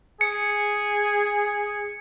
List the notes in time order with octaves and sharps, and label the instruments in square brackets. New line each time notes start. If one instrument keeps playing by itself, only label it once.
[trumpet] G#4 [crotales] C#7